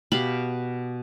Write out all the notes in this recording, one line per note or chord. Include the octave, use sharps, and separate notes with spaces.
B2 G4 F5 B5